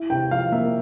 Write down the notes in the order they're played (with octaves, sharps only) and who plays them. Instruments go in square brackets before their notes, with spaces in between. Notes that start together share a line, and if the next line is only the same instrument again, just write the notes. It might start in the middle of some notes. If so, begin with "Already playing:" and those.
Already playing: [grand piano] E4
C3 G5
F3 F5
A#3 E5